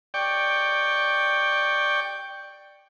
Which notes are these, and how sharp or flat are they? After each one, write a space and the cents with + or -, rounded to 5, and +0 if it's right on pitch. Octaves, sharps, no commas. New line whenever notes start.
D5 +10 G5 +0 C#6 +0